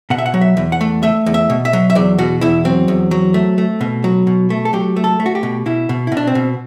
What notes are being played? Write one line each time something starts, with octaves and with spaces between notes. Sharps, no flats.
B2 F#5
E5
F#5
F#3
E5
E2
F#5
A3
A3 E5
E2
E5
B2
E5
F#3
E5
E2 D5
B2 F#4
E2 E4
F#3 C4
E2
F#3
A3
A3
B2
F#3
B2
A3
A4
F#3 G4
A3
A4
A3
F#4
G4
B2
B2 E4
B2
E4
B2
D4
C4
B2